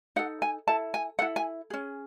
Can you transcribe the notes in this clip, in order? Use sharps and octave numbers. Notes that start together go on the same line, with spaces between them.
D#4 A4 F#5
G#5
E4 A4 A5
G#5
E4 A4 F#5
G#5
C#4 G#4